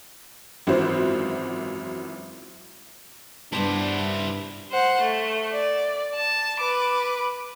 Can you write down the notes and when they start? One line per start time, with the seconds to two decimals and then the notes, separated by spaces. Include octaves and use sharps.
0.67 G#1 F#2 E3 F4 F#4 C5
3.53 G2 B3 D4 E4 G4 C5 A5
4.71 C5 F#5
5.01 A3
5.52 D5
6.15 A5
6.60 B4 D6